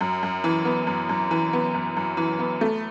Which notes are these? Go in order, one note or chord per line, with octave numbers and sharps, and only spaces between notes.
F#2
F#2
E3
B3
F#2
F#2
E3
B3
F#2
F#2
E3
B3
A3